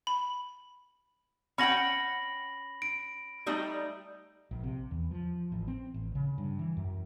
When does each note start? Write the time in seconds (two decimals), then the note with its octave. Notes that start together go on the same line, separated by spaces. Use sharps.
0.07 B5
1.58 C#4 F#5 G5 B5 A#6 F#7
2.82 D7
3.46 G3 A3 D#4
4.51 A#1
4.64 C3
4.91 E2
5.11 F3
5.52 A1
5.68 C4
5.94 A1
6.15 C#3
6.38 G2
6.59 E3
6.77 F#2